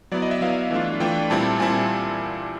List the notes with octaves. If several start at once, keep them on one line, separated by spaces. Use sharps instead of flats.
F#3 B3 E4 D5
D#5
E5
F#3 B3 E4 F5
E3 A3 D4 F4
E3 A3 D4 F4 G5
A#2 G3 C4 E4 A5
A#2 G3 C4 E4 G#5